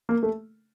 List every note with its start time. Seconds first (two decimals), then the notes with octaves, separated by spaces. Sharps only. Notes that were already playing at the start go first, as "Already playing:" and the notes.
0.09 A#3
0.23 A3